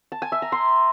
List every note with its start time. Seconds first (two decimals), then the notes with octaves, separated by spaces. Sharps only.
0.12 A5
0.22 G#5
0.32 E5
0.42 A#5
0.52 C6